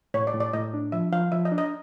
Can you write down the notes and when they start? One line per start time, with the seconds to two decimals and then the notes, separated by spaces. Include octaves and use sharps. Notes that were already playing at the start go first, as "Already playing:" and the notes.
0.14 A2 C#5
0.27 D5
0.34 A2
0.40 D5
0.53 A2 D#5
0.74 D4
0.92 F3 E5
1.12 F3 F5
1.32 F3 E5
1.45 D#5
1.52 D4
1.58 D#5